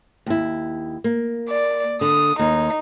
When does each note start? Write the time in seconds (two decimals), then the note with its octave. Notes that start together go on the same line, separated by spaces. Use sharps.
0.26 D#2 E4
1.04 A#3
1.49 D5
2.01 D3 D#6
2.39 D#2 D#4